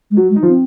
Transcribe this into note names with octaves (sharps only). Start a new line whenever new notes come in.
G#3
F#3 F#4
G#3
D#4
F3 F4
C4